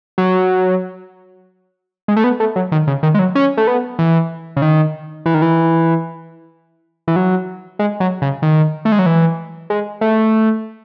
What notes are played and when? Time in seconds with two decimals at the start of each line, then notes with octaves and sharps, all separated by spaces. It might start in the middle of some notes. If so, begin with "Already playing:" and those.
0.18 F#3
2.08 G#3
2.16 A3
2.24 B3
2.40 A3
2.56 F#3
2.72 D#3
2.87 C#3
3.03 D#3
3.14 G#3
3.19 F#3
3.35 C#4
3.57 A3
3.67 B3
3.99 E3
4.57 C#3
4.62 D#3
5.26 E3
5.34 D#3
5.42 E3
7.07 E3
7.16 F#3
7.79 G#3
8.00 F#3
8.22 C#3
8.42 D#3
8.85 A3
8.92 G#3
8.99 F#3
9.06 E3
9.70 G#3
10.01 A3